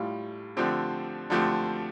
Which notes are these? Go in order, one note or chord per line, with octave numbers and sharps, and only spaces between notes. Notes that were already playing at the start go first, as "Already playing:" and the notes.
Already playing: A2 G3 F4
D3 F3 A3 C4 G4
D3 F3 A3 C4 G4